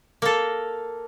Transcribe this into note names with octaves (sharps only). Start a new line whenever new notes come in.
A#3 A4